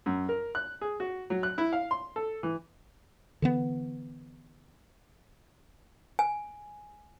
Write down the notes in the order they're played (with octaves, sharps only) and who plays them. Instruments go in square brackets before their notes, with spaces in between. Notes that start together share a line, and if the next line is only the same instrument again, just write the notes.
[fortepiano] F#2
A#4
F#6
G#4
F#4
F#3
F#6
E4
F5
C6
A4
E3
[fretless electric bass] D3 E3 B3
[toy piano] G#5